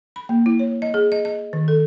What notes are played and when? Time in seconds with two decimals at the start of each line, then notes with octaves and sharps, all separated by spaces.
0.16 B5
0.29 A#3
0.46 E4
0.59 C#5
0.82 D#5
0.94 G#4
1.12 D#5
1.25 D#5
1.53 D#3
1.68 A4